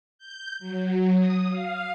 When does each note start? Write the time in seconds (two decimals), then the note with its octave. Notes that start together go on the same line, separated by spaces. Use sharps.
0.18 G6
0.59 F#3
1.15 D#6
1.48 F5